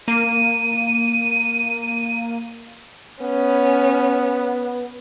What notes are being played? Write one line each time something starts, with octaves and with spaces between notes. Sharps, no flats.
A#3 D#7
B3 C#4